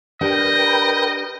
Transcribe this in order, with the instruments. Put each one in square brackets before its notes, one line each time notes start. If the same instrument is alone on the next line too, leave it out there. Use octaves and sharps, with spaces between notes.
[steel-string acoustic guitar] D4 G4 F#5 [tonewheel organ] A#4 B4 G5 [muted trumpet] D#5